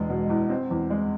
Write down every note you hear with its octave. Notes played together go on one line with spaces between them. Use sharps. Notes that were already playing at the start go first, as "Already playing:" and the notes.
Already playing: E1 G#3
B2
E2
C4
E2
G#3